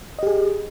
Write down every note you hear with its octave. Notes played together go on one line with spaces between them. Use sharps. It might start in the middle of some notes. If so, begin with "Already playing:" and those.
G4 G#4 D#5